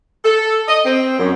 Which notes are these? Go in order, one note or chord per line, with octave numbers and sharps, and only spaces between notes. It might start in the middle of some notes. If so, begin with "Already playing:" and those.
A4
D#5
C4
F#2